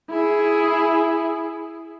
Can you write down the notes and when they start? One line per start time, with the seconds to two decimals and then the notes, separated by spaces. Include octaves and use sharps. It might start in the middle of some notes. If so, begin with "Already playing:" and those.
0.11 E4 G#4